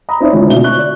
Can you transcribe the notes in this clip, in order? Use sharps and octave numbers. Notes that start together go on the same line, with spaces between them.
A#5 B5 D#6
C4 D#4 E4 C#5 D5
G#1 C#2 D3
D2 B2 D5 E5 G7
C#6 F#6
D5